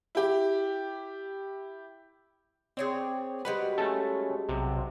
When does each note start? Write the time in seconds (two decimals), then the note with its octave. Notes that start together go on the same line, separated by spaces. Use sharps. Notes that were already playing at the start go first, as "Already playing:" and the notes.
0.15 E4 G4
2.77 C4 G#4 C#5 D5
3.45 G3 G#3 F#4 B4
3.78 A3 C#4 A4
4.49 B1 C3